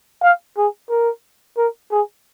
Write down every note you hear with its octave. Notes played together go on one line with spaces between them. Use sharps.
F5
G#4
A#4
A#4
G#4